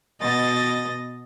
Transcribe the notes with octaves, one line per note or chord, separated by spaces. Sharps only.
B2 D#5 A6